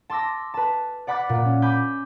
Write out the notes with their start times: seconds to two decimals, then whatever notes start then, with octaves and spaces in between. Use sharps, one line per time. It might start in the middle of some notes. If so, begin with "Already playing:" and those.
0.10 A5 C6 D6 E6 A#6
0.54 B4 A5
1.07 D5 F#5 B5 D6 F#6 A6
1.29 A#2
1.45 C#4
1.62 G#5 B5 D6 G6